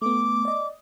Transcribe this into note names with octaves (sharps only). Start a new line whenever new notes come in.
A3 B3 D6
D5 D#5